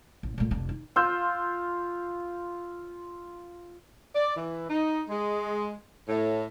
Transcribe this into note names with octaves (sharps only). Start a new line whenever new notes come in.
A1
A#2 A3
F1 D4
D#4
F4 C6 E6 G6
D5
E3
D#4
G#3
A2